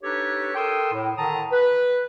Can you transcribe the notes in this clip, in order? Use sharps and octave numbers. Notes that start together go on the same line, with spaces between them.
D4 D#4 G4 A4 B4 C#5
A4 A#4 G5 C6 D#6 E6
A2
A2 D3 D#3 A5 A#5 D#6
B4